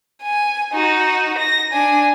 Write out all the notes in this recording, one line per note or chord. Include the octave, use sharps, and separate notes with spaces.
G#5
D#4 F#4
A#6
D4 G#5